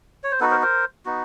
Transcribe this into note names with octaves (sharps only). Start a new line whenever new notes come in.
C#5
C5
B3 D#4 F#4 A4 B4
A#4 C5
A#4 C5
B3 D#4 F#4